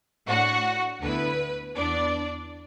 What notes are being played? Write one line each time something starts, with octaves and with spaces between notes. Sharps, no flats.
A2 A3 D4 F#4 F#5
D2 D3 B3 E4 B4
E2 E3 B3 D4 D5